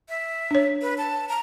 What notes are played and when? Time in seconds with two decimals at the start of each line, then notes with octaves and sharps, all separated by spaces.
0.09 E5
0.51 D4 C#5
0.82 B4
0.98 A5
1.29 A#5